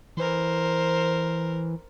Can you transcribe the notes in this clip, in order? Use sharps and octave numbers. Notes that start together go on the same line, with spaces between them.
E3 A#4 C5